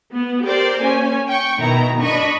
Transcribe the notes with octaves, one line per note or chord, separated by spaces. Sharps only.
B3
G4 A#4 C5 D5
A#3 C#4 G#5
G5 C#6
B2 D#3 E4 A#5
D4 D#5 B5 C#6